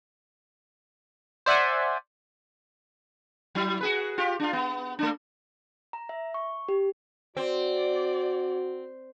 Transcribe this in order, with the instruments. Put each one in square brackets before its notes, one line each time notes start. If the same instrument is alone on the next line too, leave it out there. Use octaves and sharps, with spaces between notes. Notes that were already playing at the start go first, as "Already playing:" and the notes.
[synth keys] C5 D5 E5 F#5 G#5
[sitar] F#3 E4
F#4 G#4 B4
F4 G4
D4 F4
B3
A3 D4
[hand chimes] A#5
E5
C#6
G4
[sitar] C4 [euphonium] F#4 [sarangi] D5